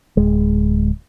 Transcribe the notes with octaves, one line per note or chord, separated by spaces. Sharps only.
D1 G#3